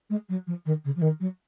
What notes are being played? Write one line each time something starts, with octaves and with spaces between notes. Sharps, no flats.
G#3
F#3
F3
D#3
C#3
F3
D#3
F#3